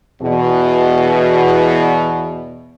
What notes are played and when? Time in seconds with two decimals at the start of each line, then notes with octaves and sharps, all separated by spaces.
0.22 E2 B2